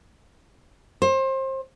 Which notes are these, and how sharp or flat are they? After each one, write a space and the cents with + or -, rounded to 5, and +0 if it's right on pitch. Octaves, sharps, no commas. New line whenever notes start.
C5 +30